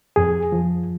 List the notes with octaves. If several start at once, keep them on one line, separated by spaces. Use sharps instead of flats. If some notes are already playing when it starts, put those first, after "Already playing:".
F2 G#4
F3